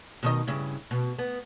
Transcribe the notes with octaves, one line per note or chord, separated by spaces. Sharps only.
B2 D#3 D#5
G2 C#3 E4
B2
B3